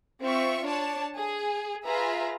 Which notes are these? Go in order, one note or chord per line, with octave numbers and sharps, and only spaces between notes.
C4 F4 E5 C#6
D4 C#5 A5
G#4
F4 G#4 B4 E5 A#5